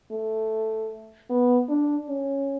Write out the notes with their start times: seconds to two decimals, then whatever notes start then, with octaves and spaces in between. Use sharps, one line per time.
0.12 A3
1.30 B3
1.69 D4
2.09 C#4